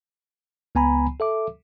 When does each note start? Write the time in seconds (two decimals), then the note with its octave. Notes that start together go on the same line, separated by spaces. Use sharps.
0.75 C#2 B3 G#5 A#5 B5
1.20 A4 E5 D6